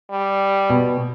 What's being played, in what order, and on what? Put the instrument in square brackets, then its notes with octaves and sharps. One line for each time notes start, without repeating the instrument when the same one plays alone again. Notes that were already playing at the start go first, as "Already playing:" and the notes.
[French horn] G3
[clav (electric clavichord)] B2